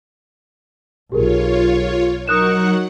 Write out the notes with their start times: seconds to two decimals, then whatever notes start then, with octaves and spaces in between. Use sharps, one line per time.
1.12 B1 F4 G4 G#4 A#4 C#5
2.28 F#3 D#4 A#4 F#5 C#6 D#6 F#6 E7